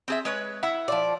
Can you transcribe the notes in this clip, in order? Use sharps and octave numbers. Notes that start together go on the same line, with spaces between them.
C4 G#4 E5
G#3 B4 C#5
E4 E5 F#5
F3 D5